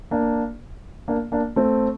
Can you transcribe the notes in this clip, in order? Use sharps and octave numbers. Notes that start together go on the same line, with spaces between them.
A#3 D4
A#3 D4
A#3 D4
A3 C4